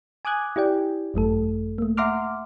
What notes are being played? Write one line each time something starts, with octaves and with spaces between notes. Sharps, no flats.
G#5 D6 D#6 F#6 G#6
E4 G4 D5 G5
G#1 F#2 A3 A4
A3 A#3
E5 F#5 A#5 C6 D6 F6